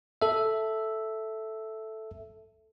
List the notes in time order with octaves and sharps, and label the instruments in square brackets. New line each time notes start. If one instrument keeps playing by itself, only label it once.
[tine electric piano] A4 E5